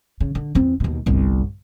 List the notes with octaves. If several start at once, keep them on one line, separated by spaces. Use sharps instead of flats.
C#3
D3
E2 C4
D#2 B2
G1 C2